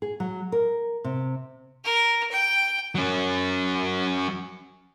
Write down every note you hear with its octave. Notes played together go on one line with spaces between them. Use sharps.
G#4
F#3
A#4
C3
A#4
G5
F#3 C#4